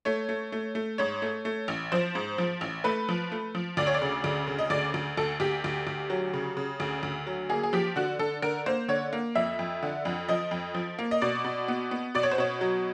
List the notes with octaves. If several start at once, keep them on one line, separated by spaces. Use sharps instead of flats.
A3 C#5
A3
A3
A3
G#2 C#5
A3
A3
A1
F3 C5
G#2
F3
A1
A3 B4
F3
A3
F3
D2 D5
C#5
D5
C#3
D2
C#3
D#5
D2 D5
D2
D2 A4
D2 G4
D2
D2
F#3
C#3
C#3
D2
D2
F#3
A#3 G#4
G#4
F3 G4
D3 F#4
D3 A4
D3 A#4
A#3 C5
D3 C#5
A#3
F2 E5
F2
D3
F2
F3 D#5
F2
F3
A#3
D#5
B2 D5
B2
B3
B3
B2 D5
C#5
C5
B2 C#5
F#3